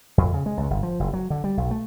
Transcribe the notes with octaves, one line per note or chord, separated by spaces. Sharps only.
F2
C#3
G#3
C#2
G1
F3
F#1
F#3
D3
G3
B1
A3